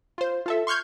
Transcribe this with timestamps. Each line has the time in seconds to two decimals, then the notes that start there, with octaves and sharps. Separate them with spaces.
0.18 F4 C5
0.46 F4 A4 E5
0.67 C6 C#6 F6 G6 G#6